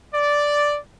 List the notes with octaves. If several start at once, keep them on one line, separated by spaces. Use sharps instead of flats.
D5